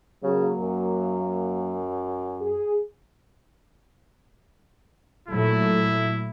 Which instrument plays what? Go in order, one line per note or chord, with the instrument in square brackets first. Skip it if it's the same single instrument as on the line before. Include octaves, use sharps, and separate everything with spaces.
[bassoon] C#3 [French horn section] F#3 A#3
[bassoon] F#2
[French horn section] G#4
[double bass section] A#2 F#3 A3 [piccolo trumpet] E4